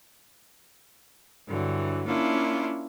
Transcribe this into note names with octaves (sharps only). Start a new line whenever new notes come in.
G2 D3 E3 F#3
A#3 C#4 D4 E4 F4